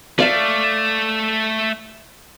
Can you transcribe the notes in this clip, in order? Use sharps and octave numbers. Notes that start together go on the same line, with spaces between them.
A3 D5 F5